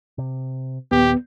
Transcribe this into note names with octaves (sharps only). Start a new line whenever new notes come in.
C3
D#2 A#2 B3 G4